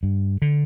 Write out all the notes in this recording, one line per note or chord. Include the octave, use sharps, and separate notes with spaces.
G2
D3